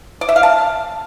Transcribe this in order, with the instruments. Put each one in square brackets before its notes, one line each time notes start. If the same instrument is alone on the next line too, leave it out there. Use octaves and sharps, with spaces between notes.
[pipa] D5
E5
F5
A5